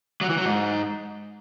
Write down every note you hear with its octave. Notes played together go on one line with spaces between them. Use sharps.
F#3
E3
F#3
G#2